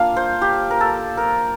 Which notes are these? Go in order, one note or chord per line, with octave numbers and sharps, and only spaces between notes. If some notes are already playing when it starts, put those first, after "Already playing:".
Already playing: A#3 D4 F4 F5
C5
G4
A#4
A4
A#4